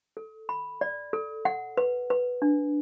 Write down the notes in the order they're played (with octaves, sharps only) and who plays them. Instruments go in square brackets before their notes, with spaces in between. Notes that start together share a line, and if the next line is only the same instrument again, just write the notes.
[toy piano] A4
B5
D5
A4
F#5
B4
B4
D4